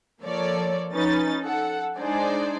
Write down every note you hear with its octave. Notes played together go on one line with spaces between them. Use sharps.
F3 A#3 A4 C#5 D5
F3 C#4 D#4 B4 A6
A4 F#5
G#3 D4 D#4 G#4 C5 D5